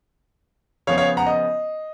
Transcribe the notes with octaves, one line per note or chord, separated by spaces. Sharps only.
C#3 F3 B3 C#5 F5
C#5 F5
F#5 A#5
D#5